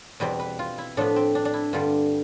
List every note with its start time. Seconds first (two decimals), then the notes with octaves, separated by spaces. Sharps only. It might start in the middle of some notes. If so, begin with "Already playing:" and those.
0.20 E2 B2 G3 C4 B4
0.40 B4
0.59 F4
0.78 E4
0.97 A2 F3 B3 D4
1.16 C4
1.35 D4
1.45 D4
1.54 E4
1.73 G2 D3 G3 F4